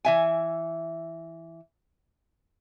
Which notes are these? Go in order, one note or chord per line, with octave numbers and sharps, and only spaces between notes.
E3 E5 G#5